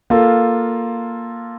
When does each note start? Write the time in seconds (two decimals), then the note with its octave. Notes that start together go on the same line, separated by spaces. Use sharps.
0.10 A#3 F4 A4